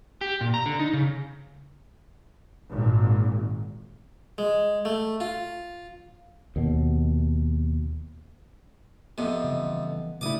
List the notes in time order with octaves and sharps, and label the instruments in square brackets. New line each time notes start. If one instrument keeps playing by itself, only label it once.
[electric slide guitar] G4
A#2
A#5
D3
D#4
C#3
[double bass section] G#1 A#2
[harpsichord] G#3
A3
F4
[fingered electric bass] D#2 B2
[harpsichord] F2 C3 [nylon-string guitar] B3 D#5 F5
[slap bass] C#3 E3 G3
[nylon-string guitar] A2 G3 E4 [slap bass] C#3 F#3 A3 [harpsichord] D6 D#6